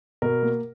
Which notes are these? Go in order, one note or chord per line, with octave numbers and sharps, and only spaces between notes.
B2 A#4
A#3